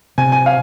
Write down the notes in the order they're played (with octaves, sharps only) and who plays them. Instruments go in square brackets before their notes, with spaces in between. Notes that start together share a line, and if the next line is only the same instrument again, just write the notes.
[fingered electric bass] C3 [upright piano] G#5
[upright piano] G#5
F5